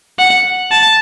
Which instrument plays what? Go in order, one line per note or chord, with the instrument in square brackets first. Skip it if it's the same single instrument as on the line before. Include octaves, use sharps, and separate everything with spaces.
[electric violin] F#5
A5